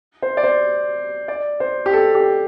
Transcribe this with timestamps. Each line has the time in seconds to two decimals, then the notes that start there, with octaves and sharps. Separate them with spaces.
0.22 C5
0.37 D5
0.44 C5
1.28 D5
1.60 C5
1.86 G4
1.93 A4
2.15 G4